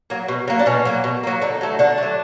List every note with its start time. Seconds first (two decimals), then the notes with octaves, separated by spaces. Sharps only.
0.10 F#3 A#3
0.28 B2
0.48 F#3 A#3
0.59 D4
0.66 B2 C#4
0.85 F#3 A#3
1.04 B2
1.23 F#3 A#3
1.42 D3 D#4
1.61 F#3 A3
1.79 D3 D4
1.98 F#3 A3